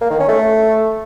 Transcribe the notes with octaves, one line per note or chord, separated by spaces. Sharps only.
A#3
D#3
C#4
A3